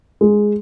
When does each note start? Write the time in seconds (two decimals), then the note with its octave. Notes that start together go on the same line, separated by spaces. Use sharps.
0.21 G#3